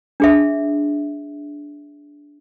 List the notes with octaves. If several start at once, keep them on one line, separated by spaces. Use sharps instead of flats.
D4 G#4 E5